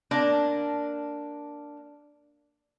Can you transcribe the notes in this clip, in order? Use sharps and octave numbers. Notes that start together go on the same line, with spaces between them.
A#3 D4 A5